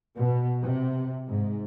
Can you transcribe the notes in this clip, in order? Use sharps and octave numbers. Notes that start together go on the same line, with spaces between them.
B2
C3
G#2